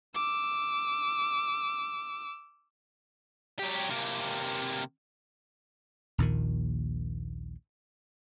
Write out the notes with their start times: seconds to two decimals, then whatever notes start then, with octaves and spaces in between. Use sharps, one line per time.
0.15 D6 E6
3.59 F#3 G4
3.89 C3 A#3
6.18 A#1 D#2 A#2 D#3